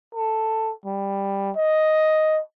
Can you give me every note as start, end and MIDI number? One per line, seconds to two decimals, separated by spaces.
0.15 0.73 69
0.86 1.51 55
1.56 2.41 75